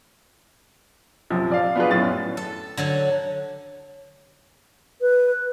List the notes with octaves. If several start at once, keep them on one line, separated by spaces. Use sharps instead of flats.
A#1 F#2 C3 F3
D5 F5
B3 D4 F4 F#4 G#4 B4
F#2 A2 A6
A4
D3 F#3 A4
B4